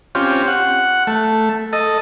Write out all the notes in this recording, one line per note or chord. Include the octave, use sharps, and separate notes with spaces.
C4 C#4 F4 G4
F#5
A3
A4 D#5